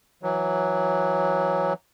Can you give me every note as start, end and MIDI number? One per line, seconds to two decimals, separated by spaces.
0.23 1.73 52
0.23 1.73 54